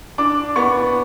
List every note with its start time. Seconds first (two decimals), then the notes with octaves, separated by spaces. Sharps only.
0.18 D4 D6
0.56 B3 C#6